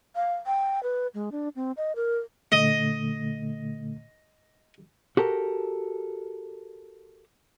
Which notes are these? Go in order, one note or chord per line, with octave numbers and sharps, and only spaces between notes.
F5
G5
B4
G#3
D4
C4
D#5
A#4
A#2 D3 A3 D#5
F#4 G4 A4 A#4